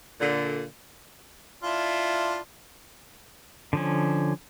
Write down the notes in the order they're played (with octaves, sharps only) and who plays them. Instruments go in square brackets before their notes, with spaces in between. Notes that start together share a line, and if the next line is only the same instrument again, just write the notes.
[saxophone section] A#2 D3
[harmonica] D4 E4 F4
[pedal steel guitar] D3 F3 C#4